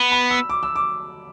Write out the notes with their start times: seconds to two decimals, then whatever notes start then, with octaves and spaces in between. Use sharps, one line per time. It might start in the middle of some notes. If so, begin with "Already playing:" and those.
Already playing: B3 B5
0.12 B5
0.31 E6
0.50 D6
0.63 E6
0.76 D6